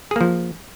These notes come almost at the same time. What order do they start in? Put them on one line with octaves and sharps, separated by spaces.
G#4 A#3 F3